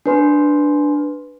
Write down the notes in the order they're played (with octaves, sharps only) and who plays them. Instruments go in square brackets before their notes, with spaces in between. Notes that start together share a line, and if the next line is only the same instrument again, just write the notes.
[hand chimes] D4 B4 C6